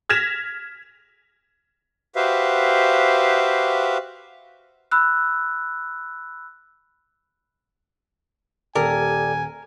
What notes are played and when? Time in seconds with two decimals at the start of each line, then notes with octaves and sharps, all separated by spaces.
0.09 F6 G#6 A#6 B6 E7 F7
2.16 F#4 G4 B4 C5 E5 F5
4.91 B5 E6 F#6
8.76 D#1 G4 A4 A#4 D5 G#5